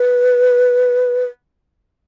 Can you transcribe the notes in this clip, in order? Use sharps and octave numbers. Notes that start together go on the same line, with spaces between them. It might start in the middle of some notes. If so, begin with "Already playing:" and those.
Already playing: B4